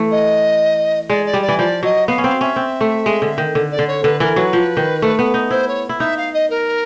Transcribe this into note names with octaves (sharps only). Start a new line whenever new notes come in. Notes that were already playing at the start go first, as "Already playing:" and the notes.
Already playing: E3 A3
D#5
G#3 D5
D5
G3
D5
E3
F3 D5
F#3 D#5
B3 F5
C#4
C4 F5
C#4 E5
C4
A3
G#3
D3
D#3
D3
D5
D3
C#5
D3 B4
E3 A#4
F#3 B4
F3
D#3
A3
B3
D#4
E4 C5
C#5
E4
D#4 E5
F5
D#5
A#4